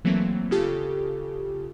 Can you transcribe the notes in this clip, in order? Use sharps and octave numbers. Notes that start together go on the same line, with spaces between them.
E3 F#3 A3 A#3 C4
C#3 F4 G4 A4